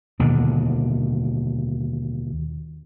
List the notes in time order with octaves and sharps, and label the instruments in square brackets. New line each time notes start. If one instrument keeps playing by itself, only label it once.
[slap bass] D#2 B2 D3